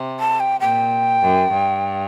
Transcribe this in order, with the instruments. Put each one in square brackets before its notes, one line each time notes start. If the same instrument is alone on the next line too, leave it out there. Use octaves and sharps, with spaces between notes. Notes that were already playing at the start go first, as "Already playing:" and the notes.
Already playing: [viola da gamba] C3
[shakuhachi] A5
G5
[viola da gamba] A#2 [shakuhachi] G5
[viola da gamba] F#2
G2